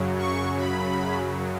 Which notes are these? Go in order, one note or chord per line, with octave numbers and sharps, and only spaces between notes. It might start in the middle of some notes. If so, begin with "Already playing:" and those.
Already playing: F#2 C#3 F#3
C#6
B5